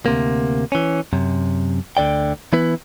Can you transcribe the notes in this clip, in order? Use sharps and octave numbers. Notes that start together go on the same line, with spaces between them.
D2 C3 A#3
E3 C#4
F#2 C3
D2 D3 D5 G5
E3 B3 E4 B4